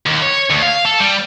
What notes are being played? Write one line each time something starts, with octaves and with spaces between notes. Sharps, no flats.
D#2
C#5
D2
F5
A4
G3